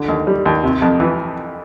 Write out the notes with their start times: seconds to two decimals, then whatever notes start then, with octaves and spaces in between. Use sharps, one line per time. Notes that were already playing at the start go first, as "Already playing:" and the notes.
Already playing: D3
0.08 D#2
0.27 G3
0.46 D#2
0.64 C3
0.82 F2
1.00 E3